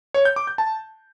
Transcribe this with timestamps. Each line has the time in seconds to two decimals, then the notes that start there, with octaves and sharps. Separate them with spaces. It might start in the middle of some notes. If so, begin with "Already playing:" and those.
0.14 C#5
0.25 G6
0.36 D6
0.47 G6
0.58 A5